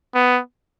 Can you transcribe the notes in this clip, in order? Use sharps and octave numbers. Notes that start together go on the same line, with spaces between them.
B3